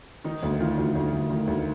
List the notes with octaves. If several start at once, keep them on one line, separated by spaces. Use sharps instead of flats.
D#3 D#4
D2
D#3 F4
D2
D2
D2
D#3
D2